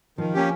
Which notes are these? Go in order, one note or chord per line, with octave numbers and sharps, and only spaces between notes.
D#3 F3
A#3 C#4 G4